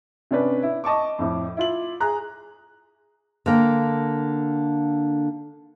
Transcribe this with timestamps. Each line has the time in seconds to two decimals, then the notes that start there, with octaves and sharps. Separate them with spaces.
0.31 C3 C#4 D4 B4
0.63 E4
0.84 D#5 A5 C#6 D6
1.19 F2 A2
1.57 E4 F4 F#7
2.00 G#4 A#5 F#6
3.46 D3 A#3 G5